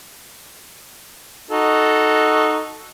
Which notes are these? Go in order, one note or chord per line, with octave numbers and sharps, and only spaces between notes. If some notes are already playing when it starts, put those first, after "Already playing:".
D#4 F#4 A4